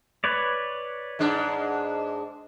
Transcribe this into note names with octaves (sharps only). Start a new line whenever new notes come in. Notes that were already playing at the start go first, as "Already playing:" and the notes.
B4 C#5 D5
G#2 G#3 D4